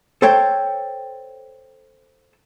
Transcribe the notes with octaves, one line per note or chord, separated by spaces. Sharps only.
A4 C5 C#5 G5